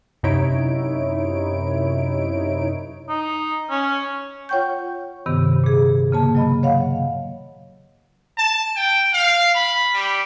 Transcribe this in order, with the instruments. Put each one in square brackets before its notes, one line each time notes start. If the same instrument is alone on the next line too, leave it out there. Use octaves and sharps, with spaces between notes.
[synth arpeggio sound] F#2 C3 D#4 E4 C#5 D7
[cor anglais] D#4
C#4
[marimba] F4 C#5 F#5 G5 C#6 G6
G2 C3 D#3 B3
A#2 G#4
C#3 A#3 A5
F#3 D#5 B5
C#5 D#5 F5 F#5
[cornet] A5
G5
F5
B5
G3